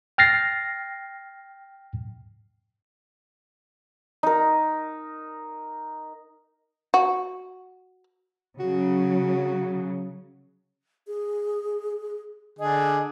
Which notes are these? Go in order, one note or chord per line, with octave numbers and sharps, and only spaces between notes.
G5 F6 A6 A#6 C7
D#4 A#4
F#4
C#3 F#3 F#4
G#4
D3 D4 G#4 D#5